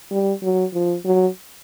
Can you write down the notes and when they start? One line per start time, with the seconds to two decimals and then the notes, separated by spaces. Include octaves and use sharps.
0.11 G3
0.42 F#3
0.73 F3
1.05 F#3